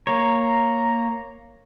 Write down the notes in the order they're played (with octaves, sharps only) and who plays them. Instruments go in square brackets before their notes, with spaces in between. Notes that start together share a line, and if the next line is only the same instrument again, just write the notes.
[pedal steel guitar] A#3 C#5 [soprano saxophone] A#5